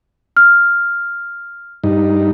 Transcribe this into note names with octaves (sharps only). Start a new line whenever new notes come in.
F6
G2 D#4